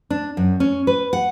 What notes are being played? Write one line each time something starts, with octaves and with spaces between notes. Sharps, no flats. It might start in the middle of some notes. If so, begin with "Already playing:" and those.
D4
F#2
C#4
B4
F#5